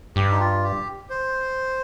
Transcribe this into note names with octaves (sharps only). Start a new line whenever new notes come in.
G2 G4
D#4
F4
G4
C5